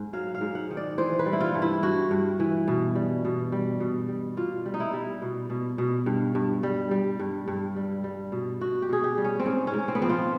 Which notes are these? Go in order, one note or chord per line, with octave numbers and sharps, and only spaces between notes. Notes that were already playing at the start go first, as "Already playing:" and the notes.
Already playing: G#2
F#3 F5
F5
G#2
F#5
D#3
D5
E3 C5
B4
G3
E4
F4
G2
E4
G2 F#4
G2
E3
B2
G3
B2
G3
B2
G3
B2 F4
G3
D#4
E4
G3
B2
B2
B2
G2
G2
G3
G3
G2
G2
G3
G3
B2
B2 F#4
G4
B2 G#4
G4
G3
C#4
C4
G#2 C#4
C#4
G#2
C4
B3
F3 C4
F4